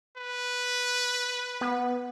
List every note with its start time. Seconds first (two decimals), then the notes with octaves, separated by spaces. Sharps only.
0.18 B4
1.61 B3